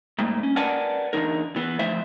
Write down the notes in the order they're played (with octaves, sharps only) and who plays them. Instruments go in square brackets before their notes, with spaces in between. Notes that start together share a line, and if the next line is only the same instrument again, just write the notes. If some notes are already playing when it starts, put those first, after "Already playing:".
[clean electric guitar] G#2 G3 A3 A#3
C#4
A#4 B4 D5 F#5 G#5 A5
E2 D3 D#3 D#4 A#4
E3 B3
D2 F3 A3 C5 E5